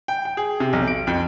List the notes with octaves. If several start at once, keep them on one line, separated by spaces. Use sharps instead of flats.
G5
G5
G#4
C3
B1
D7
F2